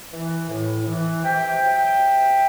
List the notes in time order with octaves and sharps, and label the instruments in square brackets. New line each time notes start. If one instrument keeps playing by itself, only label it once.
[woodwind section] E3
A2
E3
C3 E5 G5
F#3
C3